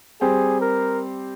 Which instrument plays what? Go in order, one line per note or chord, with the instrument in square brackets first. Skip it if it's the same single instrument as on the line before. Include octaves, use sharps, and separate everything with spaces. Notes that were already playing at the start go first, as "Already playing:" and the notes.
[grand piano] G3 C4 G4 C5 [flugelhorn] G#4
[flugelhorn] A#4